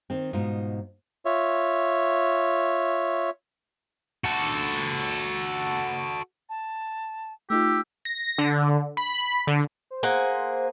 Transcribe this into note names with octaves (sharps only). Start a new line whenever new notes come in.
D#3 C4
G#2 B2 D#4 F4
F4 C#5 E5
F#4 A4
A5
A3 D#4 F4 G4 E6
A#6
D3
B5
D3
C5
A#3 G#4 F#5